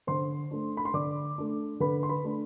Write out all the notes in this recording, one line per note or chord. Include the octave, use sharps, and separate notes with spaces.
D3 C5 C6
A3 D4
B5
C6
D3 D5 D6
A3 D4
D3 B4 B5
C6
B4 B5
A3 D4